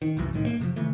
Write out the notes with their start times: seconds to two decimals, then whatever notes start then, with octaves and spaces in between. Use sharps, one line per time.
0.02 D#3
0.17 F1 C2 F#2 E3
0.33 C2 A2 D#3
0.46 A#3
0.59 F2 C3 F3
0.76 C3 D#3 E3 A3